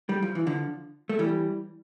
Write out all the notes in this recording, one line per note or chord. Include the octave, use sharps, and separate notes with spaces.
G3
F3
E3
D3 F3
A3
E3 G3